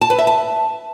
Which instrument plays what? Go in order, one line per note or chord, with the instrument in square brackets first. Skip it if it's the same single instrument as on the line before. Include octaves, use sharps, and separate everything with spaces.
[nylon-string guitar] A5
B4
E5
A5